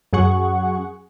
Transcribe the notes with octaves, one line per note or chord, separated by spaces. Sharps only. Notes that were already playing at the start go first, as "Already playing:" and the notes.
F#2 F#3 G#4 F#5 C#6